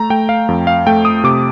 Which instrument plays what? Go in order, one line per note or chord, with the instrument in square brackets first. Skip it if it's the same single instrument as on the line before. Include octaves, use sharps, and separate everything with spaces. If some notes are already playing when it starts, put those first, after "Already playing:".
Already playing: [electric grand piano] A3 A#5
A3 G5
F5
F2
F5
A3 G5
D#6
C3 D6